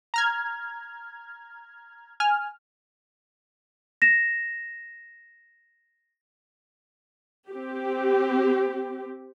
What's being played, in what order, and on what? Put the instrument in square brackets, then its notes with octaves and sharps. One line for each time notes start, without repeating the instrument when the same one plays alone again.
[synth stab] A#5 F6 G#6
G#5 F6
[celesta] A#6 E7
[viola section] C4 G4